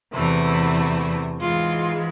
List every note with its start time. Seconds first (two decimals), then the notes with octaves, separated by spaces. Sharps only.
0.13 E2 C3 E3 A3 E4
1.39 G#2 E3 G#3 F4